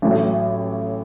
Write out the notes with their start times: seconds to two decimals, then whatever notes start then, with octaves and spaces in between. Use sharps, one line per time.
0.02 A1 A2 F#3